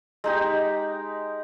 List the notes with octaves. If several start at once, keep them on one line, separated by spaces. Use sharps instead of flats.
G#3 D#4 G4